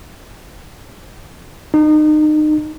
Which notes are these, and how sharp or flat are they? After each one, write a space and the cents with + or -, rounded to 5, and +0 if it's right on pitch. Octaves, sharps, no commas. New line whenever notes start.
D#4 -30